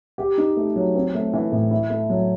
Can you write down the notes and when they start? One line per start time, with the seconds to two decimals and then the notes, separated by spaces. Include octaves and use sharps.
0.18 G4
0.38 D#4
0.57 A3
0.76 F#3
0.95 C4
1.15 A3
1.34 E3
1.52 A2
1.71 E4
1.90 A3
2.10 F#3